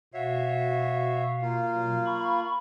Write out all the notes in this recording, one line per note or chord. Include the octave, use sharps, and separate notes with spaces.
B2 F#4 C#5 E5 F5
A#3 F4
B2 F#3
B5 C#6